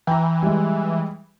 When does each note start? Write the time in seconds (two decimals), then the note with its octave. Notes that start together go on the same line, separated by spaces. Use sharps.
0.07 E3 G5 A#5
0.42 G3 G#3